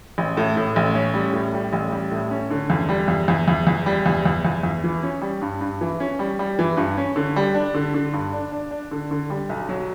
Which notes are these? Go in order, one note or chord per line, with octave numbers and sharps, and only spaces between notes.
A1
A2
A2
A1
C#4
G3
A2
G3
A1
G3
A2
C#4
D3
E2
G3
E2
E2
E2
E2
G3
E2
E2
E2
E2
E3
C#4
G3
G2
G2
E3
C#4
G3
G3
E3
G2
C#4
D3
G3
D4
D3
D3
G2
D4
D4
D4
D3
D3
G3
B1
F#3